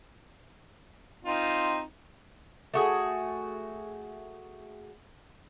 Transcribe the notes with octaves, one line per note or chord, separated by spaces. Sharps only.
C4 D#4 F4
A3 F#4 G#4